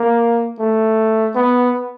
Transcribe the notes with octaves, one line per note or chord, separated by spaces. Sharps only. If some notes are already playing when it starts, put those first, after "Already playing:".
Already playing: A#3
A3
B3